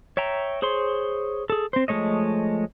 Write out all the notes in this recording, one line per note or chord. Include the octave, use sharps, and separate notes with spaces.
C#5 E5 G5 A#5
G#4 C5 C#5 C6
G#4 A4
C4 C5
F3 G#3 A3 C#5 D#5